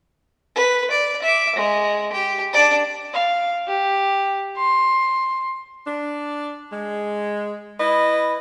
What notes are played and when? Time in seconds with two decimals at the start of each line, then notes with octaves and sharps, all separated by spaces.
0.56 B4
0.91 D5
1.23 E5 D6
1.56 G#3
2.13 G4
2.53 D4 D5
3.14 F5
3.68 G4
4.57 C6
5.87 D4
6.71 G#3
7.80 E4 B4 D#5